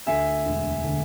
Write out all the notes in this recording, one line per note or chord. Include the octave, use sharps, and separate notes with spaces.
D2 E5 G#5
E1
D3